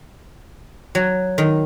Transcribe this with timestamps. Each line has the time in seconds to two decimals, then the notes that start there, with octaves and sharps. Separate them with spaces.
0.95 F#3
1.38 D#3